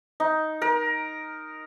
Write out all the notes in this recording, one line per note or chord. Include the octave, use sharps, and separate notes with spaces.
D#4
A#4